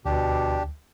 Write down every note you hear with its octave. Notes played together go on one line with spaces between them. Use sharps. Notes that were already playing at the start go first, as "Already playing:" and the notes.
D2 B2 D4 G4